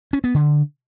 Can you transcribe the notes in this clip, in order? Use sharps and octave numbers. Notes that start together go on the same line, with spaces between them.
C#4
B3
D3